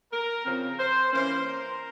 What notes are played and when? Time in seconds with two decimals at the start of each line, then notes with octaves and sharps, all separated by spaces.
0.12 A#4
0.45 C#3 F3 C4 A#4
0.79 C5
1.12 E3 A#3 C#4 C5
1.46 A#4